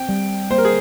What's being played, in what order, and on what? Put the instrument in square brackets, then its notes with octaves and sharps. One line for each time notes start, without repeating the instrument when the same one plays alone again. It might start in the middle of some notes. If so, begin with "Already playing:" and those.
Already playing: [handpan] C4 [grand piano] G5
[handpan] G3
[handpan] A#3 [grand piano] C5
[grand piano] A#4
G#4